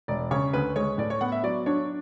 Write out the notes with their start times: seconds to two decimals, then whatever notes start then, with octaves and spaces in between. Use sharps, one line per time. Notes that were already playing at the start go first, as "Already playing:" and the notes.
0.08 E1 D5
0.31 C#3 C#5
0.53 D2 B4
0.76 G#3 C#5
0.98 A2 D5
1.10 C#5
1.21 B3 F#5
1.32 E5
1.43 F#3 D5
1.66 D4 C#5